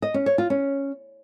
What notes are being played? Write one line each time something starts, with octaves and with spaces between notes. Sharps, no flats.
D#5
C#4
C#5
F4
C#4